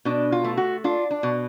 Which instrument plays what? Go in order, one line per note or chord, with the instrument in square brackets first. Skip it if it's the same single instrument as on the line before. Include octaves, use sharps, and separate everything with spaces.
[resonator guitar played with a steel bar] B2 D4
F4
A3
F#4
D4 F4
D4
B2